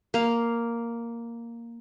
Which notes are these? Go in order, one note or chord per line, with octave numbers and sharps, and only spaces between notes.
A#3 F5